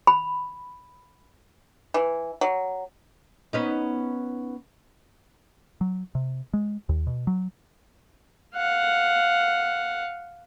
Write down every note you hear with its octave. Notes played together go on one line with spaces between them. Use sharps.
B5
E3
F#3
B3 C#4 D#4
F#3
C3
G#3
D#2
B2
F#3
F5 F#5